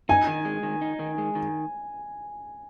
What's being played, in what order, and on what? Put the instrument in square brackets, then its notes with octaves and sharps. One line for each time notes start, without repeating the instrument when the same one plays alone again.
[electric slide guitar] D#4 [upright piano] G#5
[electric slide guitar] D#3
G#3
D#3
D#4
D#3
G#3
D#3